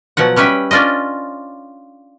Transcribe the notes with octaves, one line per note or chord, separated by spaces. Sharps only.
B2 F3 F#3 F#5
G3 C#4 B4 E5 G5
C#4 D4 F4 D5 D#5